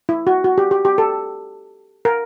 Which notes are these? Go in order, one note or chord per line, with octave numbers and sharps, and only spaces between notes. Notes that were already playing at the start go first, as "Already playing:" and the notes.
E4
F#4
F#4
G4
G4
G4
A4
A#4